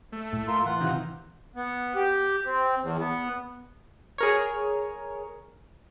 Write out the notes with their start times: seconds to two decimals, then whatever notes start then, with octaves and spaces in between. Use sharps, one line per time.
0.12 A3
0.33 A2
0.48 F4 A#4 C6
0.66 E3 F4 F#5
0.81 C3 D#3
1.56 B3
1.95 G4
2.46 C4
2.82 E2
2.99 B3
4.18 G#4 A#4 C#5